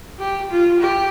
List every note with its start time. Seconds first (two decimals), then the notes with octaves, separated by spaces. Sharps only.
0.19 G4
0.51 F4
0.80 G4